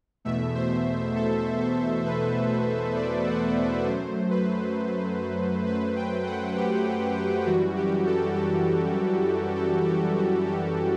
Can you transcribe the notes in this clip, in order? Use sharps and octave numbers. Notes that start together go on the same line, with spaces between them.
E2 B2 A3 E5
C5
A4
A4
B4
D5
F#5
F#2 F#3 A3 C5
B4
B4
G5
F#5
G4
F#2 E3 G3 F#4
G4
A4
A4
A4
G4
F#4
G4